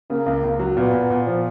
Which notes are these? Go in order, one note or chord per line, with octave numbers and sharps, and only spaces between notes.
C#3 A#3
C#2
C#2
F#3
A#2 B3
A#2
A#2
F3